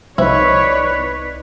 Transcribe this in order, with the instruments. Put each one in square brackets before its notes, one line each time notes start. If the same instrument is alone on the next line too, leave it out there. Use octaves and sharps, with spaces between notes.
[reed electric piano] C2 D#4 [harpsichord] F3 E4 [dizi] B4 [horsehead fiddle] C#5 D5